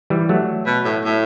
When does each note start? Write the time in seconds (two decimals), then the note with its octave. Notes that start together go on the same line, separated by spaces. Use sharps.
0.10 E3 G3
0.29 F#3 A3
0.66 B2
0.85 A2
1.04 A2